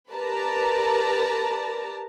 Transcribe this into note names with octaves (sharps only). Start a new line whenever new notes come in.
G4 A#4 B4 D5 A5 A#5